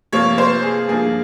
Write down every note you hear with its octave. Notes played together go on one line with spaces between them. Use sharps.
C3 F3 A#3 C#5
C5
G#4
G2 F3 A#3 G#4